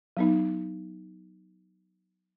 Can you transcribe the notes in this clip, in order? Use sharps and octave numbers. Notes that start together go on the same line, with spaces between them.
F#3 B3 D#4